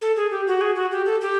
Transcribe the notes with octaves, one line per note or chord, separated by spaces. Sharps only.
A4
G#4
G4
F#4
G#4
F#4
G4
A4
G4